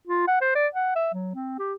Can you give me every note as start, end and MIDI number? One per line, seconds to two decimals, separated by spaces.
0.08 0.23 65
0.28 0.39 78
0.41 0.52 72
0.56 0.67 74
0.75 0.93 78
0.96 1.09 76
1.14 1.34 54
1.35 1.56 60
1.59 1.74 67